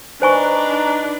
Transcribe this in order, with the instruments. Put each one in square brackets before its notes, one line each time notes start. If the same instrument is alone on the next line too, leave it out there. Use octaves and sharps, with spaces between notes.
[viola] D4 [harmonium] D#4 B4 A#5 [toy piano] C5 G#5 C#6